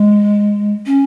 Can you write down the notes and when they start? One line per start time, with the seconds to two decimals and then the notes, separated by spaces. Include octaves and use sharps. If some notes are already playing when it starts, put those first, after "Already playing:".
Already playing: G#3
0.86 C#4